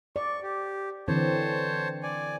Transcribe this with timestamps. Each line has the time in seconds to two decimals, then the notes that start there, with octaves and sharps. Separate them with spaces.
0.16 D5 C#6
0.43 G4
1.08 D3 E3 C4 C5 C#5 A5
2.03 D5 G#5